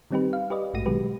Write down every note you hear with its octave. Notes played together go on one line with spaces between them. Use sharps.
D#3 G3 C4 D#4 G4 B4
F5
G4 B4 D5 D#5
A#1 G#2 A3 F#4 A#6 D#7
B2 D#3 F#3 G#3 G4 B4